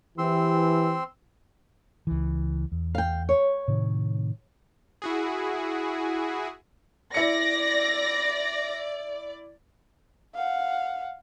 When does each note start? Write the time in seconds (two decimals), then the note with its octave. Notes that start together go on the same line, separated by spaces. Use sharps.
0.18 E3 C4 G4 C6 E6
2.07 C#2 E3
2.72 E2
2.95 F5 G5
3.29 C#5
3.68 A2 C3 D#3
5.02 E4 F#4 G#4
7.14 E4 D5 A#6 C#7
10.35 F5 F#5